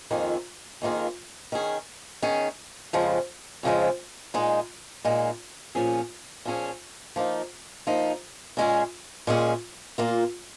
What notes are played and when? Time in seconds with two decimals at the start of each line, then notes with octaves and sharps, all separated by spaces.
0.11 F2 D#3 A#3 F4 G#4
0.82 F2 D#3 A#3 F4 G#4
1.52 D#3 C#4 G#4
2.22 D#3 C#4 G#4
2.93 F2 C#3 F3 G#3
3.63 F2 C#3 F3 G#3
4.34 A#2 G#3 D#4
5.05 A#2 G#3 D#4
5.75 A#2 F3 C#4 G#4
6.45 A#2 F3 C#4 G#4
7.16 F3 A#3 D#4
7.87 F3 A#3 D#4
8.57 A#2 G#3 C#4 G#4
9.27 A#2 G#3 C#4 G#4
9.98 A#2 A#3 F4